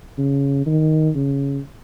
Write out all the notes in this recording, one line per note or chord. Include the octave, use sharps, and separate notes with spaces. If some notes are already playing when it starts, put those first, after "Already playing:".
C#3
D#3
C#3